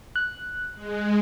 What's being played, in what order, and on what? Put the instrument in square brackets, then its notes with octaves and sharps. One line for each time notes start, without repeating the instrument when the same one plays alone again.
[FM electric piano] F#6
[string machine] G#3